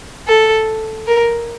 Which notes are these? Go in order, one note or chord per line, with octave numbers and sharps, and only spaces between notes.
A4
A#4